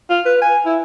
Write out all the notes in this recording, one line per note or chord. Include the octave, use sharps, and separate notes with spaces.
F4
B4
G#5
E4